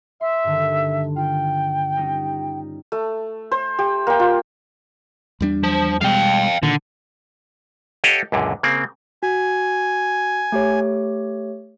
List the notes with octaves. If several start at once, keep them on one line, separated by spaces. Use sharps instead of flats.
E5 C6
G2 D3 D#3
F4 G5
G3 C#4 D#4
A3
C5
G4
A#3 G5
F4
E2 G3 D4
F3
B2 G3 G#3 F5 G5
A#2 D3 D#3
G4 A4 C#5 D#5 F5 F#5
C#2 F#2 A#2 D3
C#3 A#3 C4
F#4 G#5
A3 G4 C#5